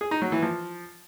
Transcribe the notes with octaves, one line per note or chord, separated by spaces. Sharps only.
G#4
D#4
F#3
E3
F3